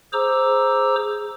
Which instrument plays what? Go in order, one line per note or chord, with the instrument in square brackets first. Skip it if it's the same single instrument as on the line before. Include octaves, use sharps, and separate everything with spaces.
[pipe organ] G#4 C5 A#5 D6 E6